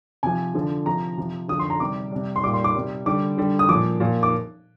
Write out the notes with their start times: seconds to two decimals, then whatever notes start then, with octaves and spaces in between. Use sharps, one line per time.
0.23 C3 F3 G#5
0.54 D3 F3
0.86 C3 F3 A#5
1.17 C3 F3
1.48 D3 D#6
1.52 F3
1.59 C6
1.70 A#5
1.80 C3 G3 D6
2.11 C3 G3
2.36 C6
2.43 G3 D6
2.46 A#2
2.54 C6
2.64 D6
2.75 C3 G3
3.06 D3 G3 D6
3.38 D3 G3
3.59 D#6
3.69 A#2 F3 D6
4.00 A#2 F3
4.23 D6